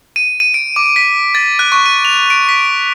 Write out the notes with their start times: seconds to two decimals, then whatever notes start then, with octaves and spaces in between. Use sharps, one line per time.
0.16 D#7
0.40 D#7
0.54 D7
0.76 D6
0.96 B6
1.35 A6
1.59 F#6
1.72 C#6
1.86 D#7
2.05 F7
2.30 D7
2.49 B6